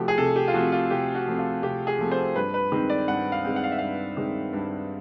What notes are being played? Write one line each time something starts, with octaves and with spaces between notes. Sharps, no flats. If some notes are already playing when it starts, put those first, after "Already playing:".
Already playing: C3 F3 A3 C4 F#4 G4
G#4
C3 A4
G4
F4
F3 A3 C4 F#4
F4
C3 G4
F#4
F3 A3 C4
F4
C3 G4
G#4
F3 A3 C4
C5
G2 B4
B4
D#3 G#3 C4
D5
G2 F#5
F5
D#3 G#3 C4
F#5
F5
E5
G2 F5
D#3 G#3 C4
G2